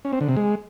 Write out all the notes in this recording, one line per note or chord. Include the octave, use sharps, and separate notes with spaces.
C#4
C4
D3
C3
G#3